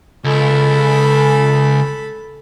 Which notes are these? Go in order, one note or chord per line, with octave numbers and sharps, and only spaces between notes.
C#2 A4 B5